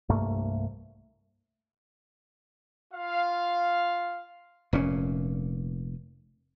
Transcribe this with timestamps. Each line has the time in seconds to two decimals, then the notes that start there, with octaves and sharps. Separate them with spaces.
0.09 C2 G2 A3 A#3
2.93 F4 F5
4.73 F1 A#2 C#4